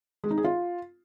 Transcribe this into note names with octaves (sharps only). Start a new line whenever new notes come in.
G#3
D#4
G#4
F4